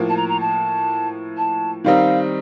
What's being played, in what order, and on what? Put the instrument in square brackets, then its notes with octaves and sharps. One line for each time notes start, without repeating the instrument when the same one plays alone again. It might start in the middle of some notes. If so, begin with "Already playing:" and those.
Already playing: [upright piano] A2 F3 A#3
[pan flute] A5
A#5
A#5
A5
A5
[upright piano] D#3 G3 C4 D#4 [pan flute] F5